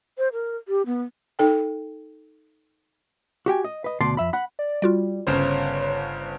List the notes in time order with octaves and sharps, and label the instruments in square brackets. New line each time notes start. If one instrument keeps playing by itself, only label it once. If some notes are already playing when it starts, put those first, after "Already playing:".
[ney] C5
A#4
G4
B3
[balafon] D#4 A4 G5
[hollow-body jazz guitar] F#4 G4 G5 G#5
D#5
B4 D#5
D2 B2 D5 A5 C6
F2 E5 B5
F#5 B5
[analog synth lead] D5
[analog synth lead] G3 [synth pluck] F4 F#4 D5
[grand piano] G1 C#3 C5 [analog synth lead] C#5